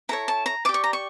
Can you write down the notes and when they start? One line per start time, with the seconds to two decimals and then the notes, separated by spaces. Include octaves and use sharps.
0.09 E4 A4 C#5 A#5
0.28 A5
0.46 A#5
0.65 D5 D6
0.69 G4
0.74 C#6
0.84 A#5
0.93 C#6